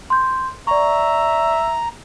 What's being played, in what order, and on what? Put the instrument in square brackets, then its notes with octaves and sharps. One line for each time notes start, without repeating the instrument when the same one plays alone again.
[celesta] C6 G6
[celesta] D5 C#6 [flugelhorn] E5 [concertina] A#5